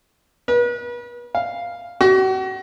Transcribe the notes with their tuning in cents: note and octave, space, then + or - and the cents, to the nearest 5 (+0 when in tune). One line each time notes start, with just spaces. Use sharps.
B4 -40
F5 +0
F#4 +40